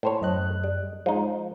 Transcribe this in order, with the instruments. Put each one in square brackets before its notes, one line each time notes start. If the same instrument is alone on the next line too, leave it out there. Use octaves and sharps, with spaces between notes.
[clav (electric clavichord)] A2 C5 C#5
[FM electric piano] F#2 D#5 F#6
[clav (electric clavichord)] G3
[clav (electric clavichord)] F3 D#4 [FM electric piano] G#3